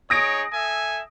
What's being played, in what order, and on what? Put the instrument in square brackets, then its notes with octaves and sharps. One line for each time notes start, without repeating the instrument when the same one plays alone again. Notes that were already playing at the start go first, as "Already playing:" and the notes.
[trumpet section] D#4 G#4 C#5 [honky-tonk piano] D#6 A#6 D7
[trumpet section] A4 E5 G#5